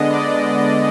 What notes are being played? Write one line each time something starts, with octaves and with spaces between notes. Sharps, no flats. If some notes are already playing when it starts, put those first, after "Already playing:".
Already playing: D3 G#3 B3 D4 D#5
D5